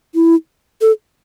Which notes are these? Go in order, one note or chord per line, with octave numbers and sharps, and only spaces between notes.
E4
A4